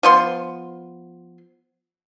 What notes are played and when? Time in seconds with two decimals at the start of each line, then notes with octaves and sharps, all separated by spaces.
0.03 F3 B3 C6